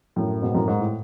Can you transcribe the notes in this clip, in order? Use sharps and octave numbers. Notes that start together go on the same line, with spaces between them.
F#2 A2
G#2 B2
F#2 A2
G#2
A2